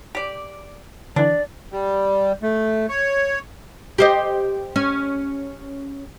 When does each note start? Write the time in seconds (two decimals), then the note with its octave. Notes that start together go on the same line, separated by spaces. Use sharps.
0.15 G4 D5
1.16 D3 E3 D4 D5
1.72 G3
2.42 A3
2.89 C#5
3.98 G4 C5 D#5
4.76 C#4